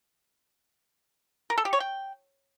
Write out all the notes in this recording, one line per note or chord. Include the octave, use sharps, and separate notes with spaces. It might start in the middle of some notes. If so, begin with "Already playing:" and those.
A#4
A4
G4
C#5
G5